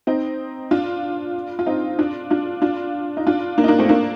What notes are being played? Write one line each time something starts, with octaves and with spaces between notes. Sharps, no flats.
C4 D#4
D4 F4
F4
C4 D#4
D4 F4
D4 F4
D4 F4
D#4
D4 F4
A#3 D4
D#4
A#3 D4
A3 C4
A#3 D4